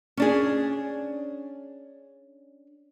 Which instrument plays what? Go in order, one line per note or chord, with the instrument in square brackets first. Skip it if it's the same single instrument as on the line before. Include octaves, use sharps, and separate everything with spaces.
[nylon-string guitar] C#4 D4 G#4